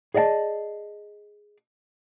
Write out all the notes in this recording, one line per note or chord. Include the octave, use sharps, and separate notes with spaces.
G#4 D5 D#5 F#5 A5